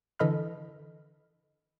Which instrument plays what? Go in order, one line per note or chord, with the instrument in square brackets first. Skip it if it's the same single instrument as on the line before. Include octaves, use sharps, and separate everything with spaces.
[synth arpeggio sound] D3 E3 A4 D#5 B5 F6